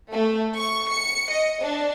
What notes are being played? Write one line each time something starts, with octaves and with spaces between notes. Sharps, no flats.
A3
C#6
C#7
D#5
D4